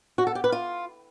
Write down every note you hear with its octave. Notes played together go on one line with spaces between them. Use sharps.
F#4
A4
G4
B4
F4